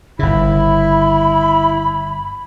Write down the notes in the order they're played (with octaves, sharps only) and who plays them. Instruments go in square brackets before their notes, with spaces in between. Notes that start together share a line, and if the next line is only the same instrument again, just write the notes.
[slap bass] G1 C#3 [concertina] E4 [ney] B5